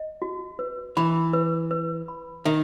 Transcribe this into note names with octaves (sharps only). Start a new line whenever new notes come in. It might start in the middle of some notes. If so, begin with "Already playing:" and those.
Already playing: D#5
F#4
B4
E3 B5
B4
B4
B5
D#3 E5